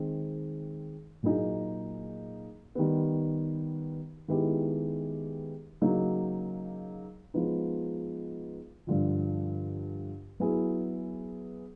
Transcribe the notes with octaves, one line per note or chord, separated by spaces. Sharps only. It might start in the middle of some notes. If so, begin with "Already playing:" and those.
Already playing: D#3 G#3 C4
A#2 F#3 A#3 D#4 G#4
D#3 G3 B3
D#3 G#3 B3 E4 G4
C#3 F#3 A#3 D#4
F3 G#3 B3 D#4
G2 D3 F3
F#3 B3 E4 G#4